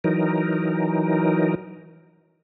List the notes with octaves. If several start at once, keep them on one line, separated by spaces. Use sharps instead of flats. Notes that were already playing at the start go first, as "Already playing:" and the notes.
E3 F#3 D#4 A#4